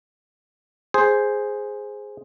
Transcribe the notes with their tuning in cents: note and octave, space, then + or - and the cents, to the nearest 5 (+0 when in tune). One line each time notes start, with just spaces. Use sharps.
G#4 +0 C5 +0